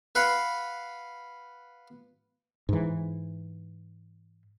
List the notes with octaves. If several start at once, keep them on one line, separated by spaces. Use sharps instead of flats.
B4 F5 F#5 B5 C6
G#2 E3